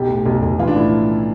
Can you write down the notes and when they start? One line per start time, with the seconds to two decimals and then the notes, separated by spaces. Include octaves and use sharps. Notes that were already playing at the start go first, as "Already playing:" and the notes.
Already playing: B1 G4
0.09 A2
0.26 B1
0.42 B1
0.59 E3 F4
0.67 D4
0.76 A2 E4